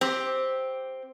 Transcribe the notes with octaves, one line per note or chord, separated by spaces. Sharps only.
C4 G4